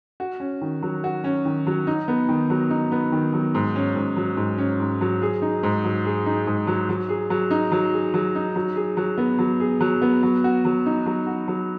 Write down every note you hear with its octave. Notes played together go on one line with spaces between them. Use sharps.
F#4
C#4
D#3
F#3
F#4
C#4
D#3
F#3
D#4
B3
D#3
F#3
D#4
B3
D#3
F#3
G#2
C#4
G#2
F#3
G#2
C#4
G#2
F#3
G#4
D#4
G#2
F#3
G#4
D#4
G#2
F#3
F#3
G#4
F#3
D#4
F#3
G#4
F#3
D#4
F#3
G#4
F#3
B3
F#3
G#4
F#3
B3
F#3
F#4
F#3
D#4
F#3
F#4
F#3